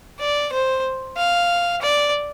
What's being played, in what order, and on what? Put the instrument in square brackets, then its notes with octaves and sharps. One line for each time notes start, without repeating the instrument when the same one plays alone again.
[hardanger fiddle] D5
C5
F5
D5